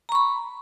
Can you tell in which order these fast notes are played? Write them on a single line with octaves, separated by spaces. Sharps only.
A#5 C#6 B5